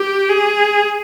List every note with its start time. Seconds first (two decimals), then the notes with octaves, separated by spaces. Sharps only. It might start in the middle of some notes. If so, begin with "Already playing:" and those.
Already playing: G4
0.29 G#4